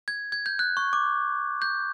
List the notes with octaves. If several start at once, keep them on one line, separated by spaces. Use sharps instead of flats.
G#6
G#6
G6
F#6
C#6
D6
G6